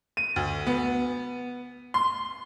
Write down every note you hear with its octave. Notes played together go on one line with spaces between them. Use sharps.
D#7
D2
B3
C6